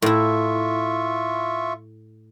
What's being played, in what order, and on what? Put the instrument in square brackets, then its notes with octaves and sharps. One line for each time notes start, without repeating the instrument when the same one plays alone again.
[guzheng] A2 E4 [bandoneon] F4 E5 C#6